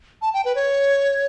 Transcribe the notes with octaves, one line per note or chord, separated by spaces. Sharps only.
A5
G5
B4
C#5